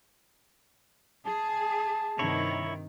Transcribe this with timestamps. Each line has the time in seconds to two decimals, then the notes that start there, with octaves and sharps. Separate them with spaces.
1.27 G#4 A5
2.19 G2 C3 D#3 E4 C#5